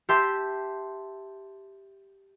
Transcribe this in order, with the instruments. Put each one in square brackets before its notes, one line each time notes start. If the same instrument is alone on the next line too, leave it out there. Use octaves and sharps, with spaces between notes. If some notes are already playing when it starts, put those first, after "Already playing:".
[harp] G4 E5 A5 C6 G6